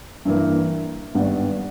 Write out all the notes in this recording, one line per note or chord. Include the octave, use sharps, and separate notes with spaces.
G2 E3 A#3
G#1 G2 G3 B3